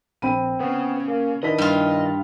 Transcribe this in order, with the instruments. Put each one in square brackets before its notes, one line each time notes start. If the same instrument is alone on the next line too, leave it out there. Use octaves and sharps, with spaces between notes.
[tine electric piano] A#1 [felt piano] C4 B5 D#7
[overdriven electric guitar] C#3 [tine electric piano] B3
[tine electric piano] A#3
[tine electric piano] D#3 D4 E4 [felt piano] B4 B6 [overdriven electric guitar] D#5
[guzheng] G2 F4